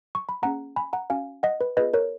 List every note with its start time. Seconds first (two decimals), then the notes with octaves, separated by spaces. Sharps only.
0.15 C#6
0.29 B5
0.42 A#3 C#4 G#4 F#5 A#5
0.76 G#5 B5
0.93 F#5 A#5
1.10 C#4 F#4 F5 G#5
1.43 D#5 F#5
1.61 B4
1.77 B3 F4 G#4 B4 D#5
1.94 A#4 C#5